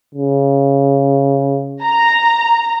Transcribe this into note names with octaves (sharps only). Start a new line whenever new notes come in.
C#3
A#5